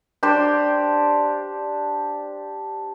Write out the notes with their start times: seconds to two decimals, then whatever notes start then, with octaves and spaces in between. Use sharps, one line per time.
0.23 D4 G4 C5 D5